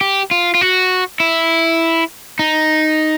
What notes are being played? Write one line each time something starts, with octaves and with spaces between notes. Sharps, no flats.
G4
F4
F4
F#4
E4
D#4